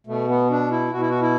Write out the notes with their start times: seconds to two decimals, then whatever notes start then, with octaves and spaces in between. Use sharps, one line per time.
0.07 B2 A3
0.28 B3
0.50 D4
0.71 E4
0.93 B2 F#4
1.01 E4
1.09 F#4
1.22 E4